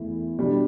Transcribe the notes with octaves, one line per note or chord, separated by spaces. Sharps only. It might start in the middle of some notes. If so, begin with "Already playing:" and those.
Already playing: E2 E3 A3 E4
B2 G3 D4